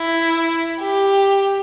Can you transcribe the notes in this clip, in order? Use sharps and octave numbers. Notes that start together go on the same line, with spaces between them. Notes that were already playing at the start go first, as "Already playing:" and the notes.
Already playing: E4
G4